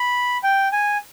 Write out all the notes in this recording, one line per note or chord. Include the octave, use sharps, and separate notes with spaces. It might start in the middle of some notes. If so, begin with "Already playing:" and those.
Already playing: B5
G5
G#5